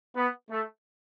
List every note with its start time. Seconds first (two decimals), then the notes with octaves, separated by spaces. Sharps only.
0.16 B3
0.50 A3